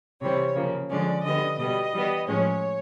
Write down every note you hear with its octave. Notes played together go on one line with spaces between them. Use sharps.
C3 E3 G3 C4 C#5
C#3 F3 A#3
D3 F3 G#3 C#4 D5
D3 G3 B3 D#5
B2 G3 B3 D#5
E3 G3 B3
A2 F3 G#3 C#4 C#5